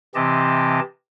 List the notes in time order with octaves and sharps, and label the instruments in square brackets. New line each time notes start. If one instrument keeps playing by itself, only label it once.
[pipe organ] C3 E3 C4 G4 D#5 A5